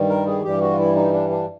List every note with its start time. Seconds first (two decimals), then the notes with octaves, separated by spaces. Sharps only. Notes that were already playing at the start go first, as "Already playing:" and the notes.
Already playing: G2 D#3 G3
0.09 A#4
0.26 G#4
0.43 G2 E3 G3 G4
0.61 F#4
0.70 F4
0.78 E4
0.95 D#4
1.13 D4
1.30 D4